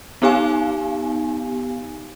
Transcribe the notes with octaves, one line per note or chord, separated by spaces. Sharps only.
B3 D#4 G4 F5 G#5